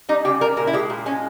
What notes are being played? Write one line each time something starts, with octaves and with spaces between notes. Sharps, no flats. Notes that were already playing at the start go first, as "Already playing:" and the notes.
G3 D#4
C#3 G4
G3 A#4
A#2 A#4
E4
G#3 G4
A#2
G#3 C#4